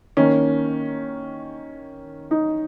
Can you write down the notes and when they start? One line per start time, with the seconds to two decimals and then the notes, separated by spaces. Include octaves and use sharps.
0.17 D#3 A#3 C#4
2.31 D#4